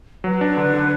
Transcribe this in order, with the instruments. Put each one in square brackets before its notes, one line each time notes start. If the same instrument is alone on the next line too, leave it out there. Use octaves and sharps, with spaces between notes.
[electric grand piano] F#3 [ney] B4
[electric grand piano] D4
D3
D3